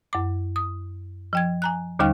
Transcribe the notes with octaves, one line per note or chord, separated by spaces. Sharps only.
F#2 D6
D#6
F3 G5 G#6
G#5 A#5 F#6
D#2 D3 G3 D#4 G5 F6